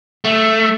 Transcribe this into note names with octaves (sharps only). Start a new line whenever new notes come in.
A3